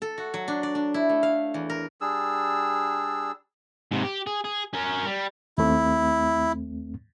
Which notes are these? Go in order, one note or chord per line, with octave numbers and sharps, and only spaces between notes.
A4
F#4
F#3
D4
D5
D4
E4
A3
F5
E2
A#4
G3 D4 G#4 E6
G#2 C3
G4
G#4
G#4
C#4 A#4
G3
D#2 A3 C4 E4